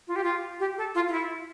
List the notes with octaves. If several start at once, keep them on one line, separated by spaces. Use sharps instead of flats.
F4
G4
F4
G4
A4
F4
F4
E4